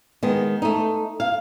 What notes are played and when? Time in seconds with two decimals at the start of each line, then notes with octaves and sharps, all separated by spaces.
0.23 D#3 G#3 B3
0.62 A3 D#4
1.20 F5